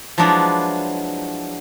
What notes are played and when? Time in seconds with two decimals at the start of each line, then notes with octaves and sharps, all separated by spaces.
0.18 F3 F#3 G#3 D4 E4 B4